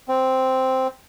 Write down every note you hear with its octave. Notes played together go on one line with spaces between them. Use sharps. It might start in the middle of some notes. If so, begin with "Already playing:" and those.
C4